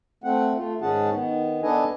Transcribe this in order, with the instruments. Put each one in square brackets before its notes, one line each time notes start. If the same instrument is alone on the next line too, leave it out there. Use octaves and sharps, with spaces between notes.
[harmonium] A3 C4 F#5
A3 F4
G#2 D#3 C#4 G#4 F#5 A5
D#3 B3
B3 D4 A4 B4 D#5 G#5